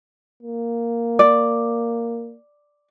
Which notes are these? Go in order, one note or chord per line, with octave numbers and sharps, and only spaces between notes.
A#3
D5